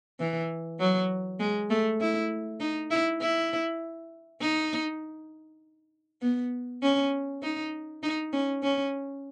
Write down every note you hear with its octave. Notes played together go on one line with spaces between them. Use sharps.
E3
F#3
G#3
A3
E4
D#4
E4
E4
D#4
B3
C#4
D#4
D#4
C#4
C#4